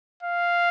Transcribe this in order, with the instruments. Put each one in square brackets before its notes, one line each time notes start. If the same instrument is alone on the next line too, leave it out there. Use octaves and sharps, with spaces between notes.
[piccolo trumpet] F5